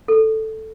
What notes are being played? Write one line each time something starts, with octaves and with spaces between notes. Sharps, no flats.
A4